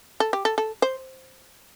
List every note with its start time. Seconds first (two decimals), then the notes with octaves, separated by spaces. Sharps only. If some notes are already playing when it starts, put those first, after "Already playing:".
0.20 A4
0.33 G4
0.45 A4
0.58 A4
0.82 C5